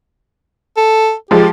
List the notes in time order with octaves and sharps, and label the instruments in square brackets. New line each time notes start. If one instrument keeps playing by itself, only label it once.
[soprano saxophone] A4
[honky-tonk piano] F3 G#3 [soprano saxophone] G4